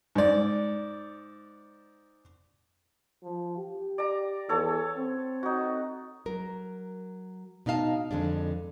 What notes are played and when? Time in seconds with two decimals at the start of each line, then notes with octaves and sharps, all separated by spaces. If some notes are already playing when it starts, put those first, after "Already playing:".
0.15 G#2 D5
3.23 F3
3.57 G4
3.98 D5 A#5
4.49 E2 A4 C#5 A5
4.97 C4
5.43 D#4 F#4
6.26 F#3 A#4
7.66 B2 D#4 D#5 F5 A5
8.11 F2 D3 G#3 D4